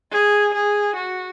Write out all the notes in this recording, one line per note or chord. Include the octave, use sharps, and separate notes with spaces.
G#4
G#4
F#4